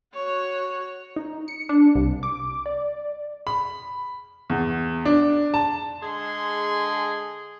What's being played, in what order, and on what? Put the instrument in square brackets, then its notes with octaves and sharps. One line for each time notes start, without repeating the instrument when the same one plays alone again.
[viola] F#4 C#5
[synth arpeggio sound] D#4
C#7
D4
C2
D6
D5
[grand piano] B5
E2
D4
A5
[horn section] D3 G#3 G#4 C6